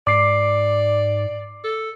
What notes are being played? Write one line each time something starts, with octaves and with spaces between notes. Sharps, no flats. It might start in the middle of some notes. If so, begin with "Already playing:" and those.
G#2 D5 D6 C7
A4